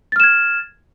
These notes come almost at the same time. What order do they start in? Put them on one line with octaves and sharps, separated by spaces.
A6 F6 E7 G#6